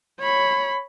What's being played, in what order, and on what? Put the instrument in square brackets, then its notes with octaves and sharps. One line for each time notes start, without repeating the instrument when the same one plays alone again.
[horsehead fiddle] C#5 B5